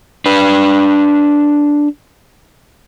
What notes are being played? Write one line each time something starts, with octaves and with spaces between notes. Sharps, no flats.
D4 B4